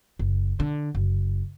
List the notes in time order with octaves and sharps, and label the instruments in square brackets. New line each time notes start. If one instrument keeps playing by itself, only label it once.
[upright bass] F#1
D3
F#1